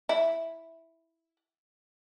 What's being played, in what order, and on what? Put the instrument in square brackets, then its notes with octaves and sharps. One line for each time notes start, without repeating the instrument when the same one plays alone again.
[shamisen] E4